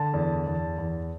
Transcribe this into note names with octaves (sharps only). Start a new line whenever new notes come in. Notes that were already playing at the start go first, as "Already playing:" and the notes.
Already playing: D3 A5
E2
E2
E2